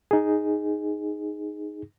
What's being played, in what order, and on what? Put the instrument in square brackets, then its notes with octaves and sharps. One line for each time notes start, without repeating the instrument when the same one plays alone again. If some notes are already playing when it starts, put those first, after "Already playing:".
[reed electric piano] D#4 G#4